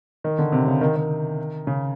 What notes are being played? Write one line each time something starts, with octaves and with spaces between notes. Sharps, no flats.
D#3
D3
C3
C#3
D#3
D#3
C#3